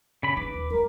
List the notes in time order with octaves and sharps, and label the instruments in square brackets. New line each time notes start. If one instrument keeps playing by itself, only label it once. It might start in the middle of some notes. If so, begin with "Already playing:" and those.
[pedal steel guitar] C#3 B5
[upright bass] D#4 [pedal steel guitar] B4 D6
[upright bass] D#2
[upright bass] G3 A3 [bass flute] A#4